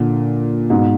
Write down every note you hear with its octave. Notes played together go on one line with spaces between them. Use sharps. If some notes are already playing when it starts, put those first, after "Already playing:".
Already playing: A#2 D3
G#2 B2